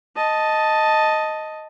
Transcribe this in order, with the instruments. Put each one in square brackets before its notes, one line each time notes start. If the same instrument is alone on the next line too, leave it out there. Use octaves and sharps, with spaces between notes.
[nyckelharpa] D#5 A5